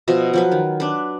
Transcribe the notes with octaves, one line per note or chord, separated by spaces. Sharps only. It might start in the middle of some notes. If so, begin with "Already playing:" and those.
B2 F3 D#5 E5
F3 F#3 B4
D#3
D4 B4